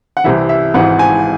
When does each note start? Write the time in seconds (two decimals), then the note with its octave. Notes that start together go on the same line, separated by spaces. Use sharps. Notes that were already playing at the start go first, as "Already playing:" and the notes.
0.17 F#5
0.24 C2 C3 E3 E5
0.49 E5
0.74 G#1 G#2 E3 F#5
0.99 G#5